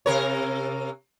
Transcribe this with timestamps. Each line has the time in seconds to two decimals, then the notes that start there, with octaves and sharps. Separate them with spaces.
0.06 C3 A#4 C#5